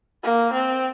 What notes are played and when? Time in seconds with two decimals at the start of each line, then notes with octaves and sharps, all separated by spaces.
0.23 A#3
0.53 C4